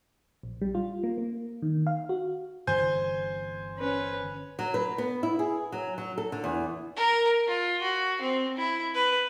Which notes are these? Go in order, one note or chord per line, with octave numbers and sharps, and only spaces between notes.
A#1
G3
F4
A#3
A#3
D#3
F5
F#4
G1 E3 C5 G#5 G6
C#4 B4
F#3
B4
B3
E4
G#4
F#3
F#3
A4
D3
E2
A#4
F4
F#4
C4
E4
B4